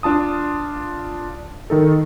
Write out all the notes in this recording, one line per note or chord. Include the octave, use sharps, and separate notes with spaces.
D4 F4 A5 D#6
D#3 D#4 A4